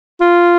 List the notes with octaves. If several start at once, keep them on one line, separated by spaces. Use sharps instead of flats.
F4